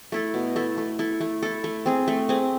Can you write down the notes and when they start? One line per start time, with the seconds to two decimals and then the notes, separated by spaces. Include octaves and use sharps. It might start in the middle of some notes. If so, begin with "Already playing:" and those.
0.12 A3 E4 A4
0.34 B2
0.56 A3 E4 A4
0.78 A3
0.99 E4 A4
1.21 A3
1.43 E4 A4
1.64 A3
1.86 C4 G#4
2.08 A3
2.29 C4 G#4